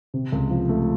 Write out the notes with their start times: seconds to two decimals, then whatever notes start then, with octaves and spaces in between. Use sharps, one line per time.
0.14 C3
0.32 C#2
0.50 F3
0.69 A3